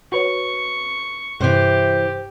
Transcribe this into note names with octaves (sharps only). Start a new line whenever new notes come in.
F#4 B4 C#5 C#6
G2 C3 E3 G4 C5